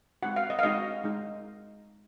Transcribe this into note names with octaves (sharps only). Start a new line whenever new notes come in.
G#3 C4 D#4 F#4 F#5
F5
D#5
F5
G#3 C4 D#4 F#4 D#5
G#3 D#4